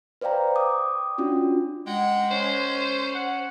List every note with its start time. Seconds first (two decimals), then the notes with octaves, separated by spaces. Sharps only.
0.22 B4 C5 D5 F5 G5 A#5
0.56 G5 D6 D#6
1.18 C#4 D4 F4 F#4
1.86 G#3 F#5 G5
2.30 C#4 C5
3.15 F#5